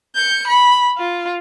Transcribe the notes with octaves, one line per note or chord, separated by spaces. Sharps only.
G6 C#7
B5
F4